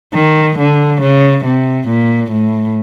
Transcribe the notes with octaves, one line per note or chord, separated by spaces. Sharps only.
D#3
D3
C#3
C3
A#2
A2